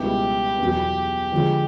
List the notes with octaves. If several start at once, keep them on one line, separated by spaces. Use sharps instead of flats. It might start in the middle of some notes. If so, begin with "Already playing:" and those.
Already playing: C#2 B2 G3 B3 E4 G4
E2 B2 F#3
D3 F3 G#3